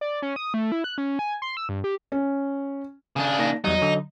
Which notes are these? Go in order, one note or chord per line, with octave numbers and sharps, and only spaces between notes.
D5
C#4
D#6
A3
E4
F#6
C#4
G#5
C6
E6
G2
G4
C#4
C#3 D4
A#3 D#4 A#6
E2 F#3 G3 D#4
D3 F#3